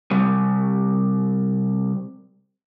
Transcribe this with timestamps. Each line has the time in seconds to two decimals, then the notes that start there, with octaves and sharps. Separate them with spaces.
0.11 C3 G3